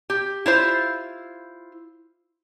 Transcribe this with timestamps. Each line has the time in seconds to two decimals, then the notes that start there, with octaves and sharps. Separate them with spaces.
0.10 G4
0.46 E4 F4 C5